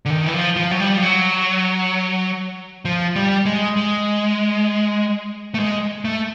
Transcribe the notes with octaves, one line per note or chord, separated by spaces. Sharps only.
D3
D#3
E3
F3
F3
F#3
G3
F3
F#3
F3
G3
G#3
G#3
A3
G#3
A3